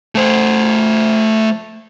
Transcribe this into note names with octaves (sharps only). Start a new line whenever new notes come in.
A3 C5